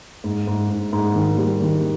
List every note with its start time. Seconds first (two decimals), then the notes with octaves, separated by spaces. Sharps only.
0.24 G#2
0.47 G#2
0.70 G#2
0.93 G#2
1.15 D#3
1.37 G3
1.61 D#3